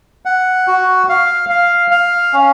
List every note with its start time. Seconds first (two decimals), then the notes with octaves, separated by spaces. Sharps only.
0.25 F#5
0.68 F#4
1.09 F5
1.49 F5
1.91 F5
2.33 C#4